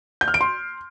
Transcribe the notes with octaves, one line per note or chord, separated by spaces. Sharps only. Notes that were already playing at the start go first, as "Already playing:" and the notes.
G6
F6
D7
C6